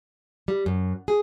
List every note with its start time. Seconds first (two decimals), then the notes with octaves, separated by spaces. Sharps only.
0.48 G3
0.66 F#2
1.08 G#4